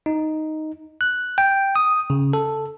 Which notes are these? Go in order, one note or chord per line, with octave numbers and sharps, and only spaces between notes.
D#4
F#6
G5
D#6
C#3
A4